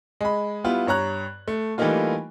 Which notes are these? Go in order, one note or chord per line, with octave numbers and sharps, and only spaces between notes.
G#3 B5
G3 B3 E4 F4
G2 C#5 A#5 F#6
A3
E3 G3 A3 A#3 D#4 F4